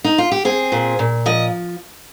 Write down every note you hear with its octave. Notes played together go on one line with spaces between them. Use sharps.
D#4
F4
G4
C4 G#4
A#2
A#2
F3 D#5